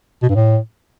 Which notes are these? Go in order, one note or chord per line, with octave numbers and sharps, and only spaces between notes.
B2
G2
A2